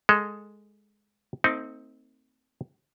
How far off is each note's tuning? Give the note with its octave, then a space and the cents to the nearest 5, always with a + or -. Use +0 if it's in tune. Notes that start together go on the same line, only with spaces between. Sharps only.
G#3 +0 A4 +0
A3 +45 C4 +0 D#4 +15